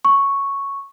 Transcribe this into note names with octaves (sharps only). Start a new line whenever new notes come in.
C#6